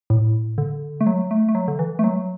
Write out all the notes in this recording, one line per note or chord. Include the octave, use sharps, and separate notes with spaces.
A2
D3
A3
F#3
A3
A3
F#3
D3
E3
A3
F#3